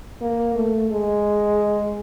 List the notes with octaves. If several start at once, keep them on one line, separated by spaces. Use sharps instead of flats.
A#3
A3
G#3